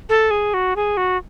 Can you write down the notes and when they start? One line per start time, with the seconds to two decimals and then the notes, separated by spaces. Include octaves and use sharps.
0.09 A4
0.31 G#4
0.54 F#4
0.76 G#4
0.97 F#4